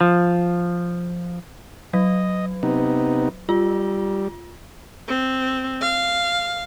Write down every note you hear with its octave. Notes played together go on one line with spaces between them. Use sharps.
F3
F#3 D#5
C3 B3 D#4
G3 F4
C4
F5